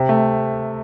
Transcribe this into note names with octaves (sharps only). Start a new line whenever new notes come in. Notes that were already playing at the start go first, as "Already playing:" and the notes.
Already playing: C3
A3